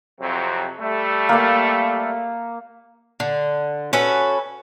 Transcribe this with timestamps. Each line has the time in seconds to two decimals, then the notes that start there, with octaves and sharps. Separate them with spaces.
0.21 F2 C3 F#3
0.81 G3 A3
1.29 A#3 F5
3.20 D3
3.93 C#4 F#4 A4 B4